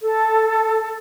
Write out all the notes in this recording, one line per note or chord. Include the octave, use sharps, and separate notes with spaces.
A4